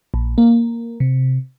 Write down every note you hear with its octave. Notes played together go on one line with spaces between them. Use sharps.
A#1
A#3
C3